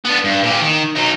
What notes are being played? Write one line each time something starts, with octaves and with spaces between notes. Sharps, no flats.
B3 D4
G2
A#2 G4
D#3
F#3 D#4